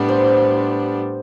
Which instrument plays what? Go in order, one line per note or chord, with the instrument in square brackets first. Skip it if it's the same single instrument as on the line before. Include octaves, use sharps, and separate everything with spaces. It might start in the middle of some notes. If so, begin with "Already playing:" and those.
Already playing: [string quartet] A2 G3 B3 D4
[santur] C5